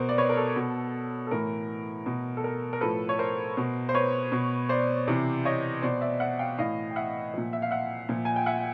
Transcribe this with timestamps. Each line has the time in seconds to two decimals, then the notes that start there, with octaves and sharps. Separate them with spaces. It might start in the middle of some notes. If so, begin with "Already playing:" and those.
Already playing: B2 A#4 C5
0.09 D5
0.18 B4 C#5
0.29 A#4
0.37 A4
0.56 B2
1.27 A4
1.31 A2 E3 A#4
2.06 B2
2.37 A4
2.44 A#4
2.73 A#4
2.81 A2 F3 A4 B4
3.09 C#5
3.19 A#4 C5
3.57 B2
3.89 C5
3.94 B4 C#5
4.32 B2
4.69 C5 D5
5.08 C3 E3
5.45 C#5 D#5
5.82 B2 C5 D5
6.01 D5 E5
6.20 E5 F#5
6.39 F5 G5
6.58 A2 E3 D#5 F5
6.91 G5
6.96 E5 F#5
7.34 A#2 F3
7.53 E5
7.62 F5
7.71 E5 F#5
8.09 A#2 F3
8.25 G#5
8.36 G5
8.46 E5 F#5